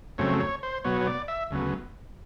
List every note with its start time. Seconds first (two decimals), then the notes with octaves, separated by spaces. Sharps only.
0.18 F2 C#3 F#3 A3 C4 C#5
0.40 C#5
0.63 C5
0.84 B2 F#3 B3 C#5
1.01 C#5
1.07 D5
1.28 E5
1.51 D2 C#3 F#3 B3